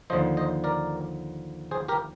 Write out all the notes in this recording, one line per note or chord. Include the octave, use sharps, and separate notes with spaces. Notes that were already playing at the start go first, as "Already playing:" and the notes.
D#2 D3 F3 C5 D#5
C5 D#5
A#4 D5
G#4 C5
G4 A#4